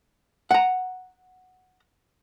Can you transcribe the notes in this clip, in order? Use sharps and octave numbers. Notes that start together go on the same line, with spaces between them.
F#5 A#5